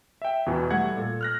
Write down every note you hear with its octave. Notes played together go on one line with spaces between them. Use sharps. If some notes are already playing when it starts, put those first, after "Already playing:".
E5 G5
E2 B2 E3
G3 A3 F#5 G#6
A#2 A4
F6 F#6 A#6